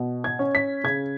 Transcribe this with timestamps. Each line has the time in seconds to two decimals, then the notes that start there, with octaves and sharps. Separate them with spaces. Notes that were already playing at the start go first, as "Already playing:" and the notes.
Already playing: B2
0.24 G#6
0.39 C#4
0.55 B6
0.84 C#3 G#6